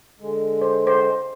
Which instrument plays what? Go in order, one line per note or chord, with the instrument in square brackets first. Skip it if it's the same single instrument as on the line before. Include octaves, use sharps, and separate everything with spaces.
[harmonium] D3 G#3
[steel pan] C5
C5